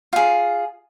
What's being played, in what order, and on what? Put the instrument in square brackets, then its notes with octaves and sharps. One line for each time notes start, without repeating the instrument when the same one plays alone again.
[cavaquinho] F4 G#4